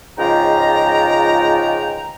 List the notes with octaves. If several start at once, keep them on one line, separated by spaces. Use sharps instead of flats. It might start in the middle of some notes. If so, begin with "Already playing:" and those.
C#2 G#2 F3 G5 A#5